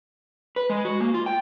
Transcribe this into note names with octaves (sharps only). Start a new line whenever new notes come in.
B4
G#3
F#4
A#3
F4
G5